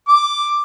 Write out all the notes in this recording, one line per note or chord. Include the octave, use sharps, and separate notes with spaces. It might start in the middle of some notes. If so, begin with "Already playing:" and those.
D6